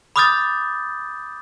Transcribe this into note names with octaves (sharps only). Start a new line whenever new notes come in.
B5 D6 D#6 F6 G6 A6